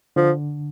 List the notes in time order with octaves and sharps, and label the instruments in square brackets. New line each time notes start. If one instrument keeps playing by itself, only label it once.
[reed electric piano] D3 [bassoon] F3